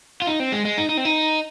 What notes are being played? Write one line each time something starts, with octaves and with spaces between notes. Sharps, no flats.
F4
D#4
C4
G#3
G#3
D#4
D#4
C4
D#4